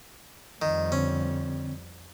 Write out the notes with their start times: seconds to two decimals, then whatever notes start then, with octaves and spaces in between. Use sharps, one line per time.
0.62 F2 D#3 G3
0.92 D3 C4 C#4